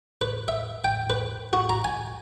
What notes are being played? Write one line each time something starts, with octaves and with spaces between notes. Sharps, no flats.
B4
E5
G5
B4
F#4
A#5
G#5